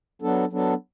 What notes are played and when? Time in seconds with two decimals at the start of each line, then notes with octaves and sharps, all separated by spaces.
0.22 F#3 B3 D4 A4
0.50 F#3 B3 D4 A4